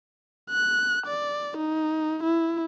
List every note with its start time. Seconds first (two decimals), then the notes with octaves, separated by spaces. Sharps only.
0.50 F#6
1.06 D5
1.57 D#4
2.23 E4